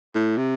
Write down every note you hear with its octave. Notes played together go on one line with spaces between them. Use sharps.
A2
C3